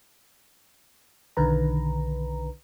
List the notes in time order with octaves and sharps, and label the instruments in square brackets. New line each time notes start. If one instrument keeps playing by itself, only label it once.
[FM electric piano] B1 D3 D#3 B4 A#5